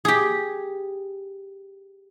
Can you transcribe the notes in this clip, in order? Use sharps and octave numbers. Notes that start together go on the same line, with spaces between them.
G4 G#4